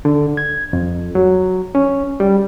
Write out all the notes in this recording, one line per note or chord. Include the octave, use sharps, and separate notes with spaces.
D3
G#6
F2
F#3
C#4
G3